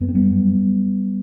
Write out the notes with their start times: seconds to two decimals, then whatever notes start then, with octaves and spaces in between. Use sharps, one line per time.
0.01 F#2 B3
0.09 C4
0.15 G3 B3
0.30 F#2